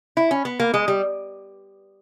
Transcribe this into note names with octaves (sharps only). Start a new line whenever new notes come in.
E4
C#4
B3
A#3
G#3
G3